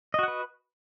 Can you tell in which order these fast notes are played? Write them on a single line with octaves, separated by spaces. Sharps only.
D#5 F#4 F#5 B4